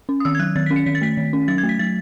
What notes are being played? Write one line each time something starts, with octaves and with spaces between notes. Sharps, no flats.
C#4
D#6
D#3 E6
G#6
F#3 F#6
D#3 A6
C#4 B6
C#7
D#3 B6
A6
A3 B6
D#3
C#4
F#3 A6
G#6
A3
B6
F#3 A6